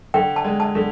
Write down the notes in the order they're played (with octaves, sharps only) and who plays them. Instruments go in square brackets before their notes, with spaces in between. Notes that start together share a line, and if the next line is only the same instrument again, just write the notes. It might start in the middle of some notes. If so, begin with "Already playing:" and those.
[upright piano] D3 [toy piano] G5
[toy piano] A5
[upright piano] G#3
[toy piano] A5
[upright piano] D3